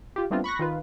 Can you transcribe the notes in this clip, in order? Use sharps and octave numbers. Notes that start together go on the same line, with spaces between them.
F4 G4
G3 A3 B3 C4 D4 F4
B5 C#6 F#6 A#6
D#3 F4 B4